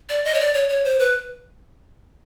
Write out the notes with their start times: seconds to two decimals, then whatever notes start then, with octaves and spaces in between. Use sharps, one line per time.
0.09 D5
0.25 D#5
0.34 C#5
0.40 D5
0.54 C#5
0.69 C#5
0.85 C5
0.99 B4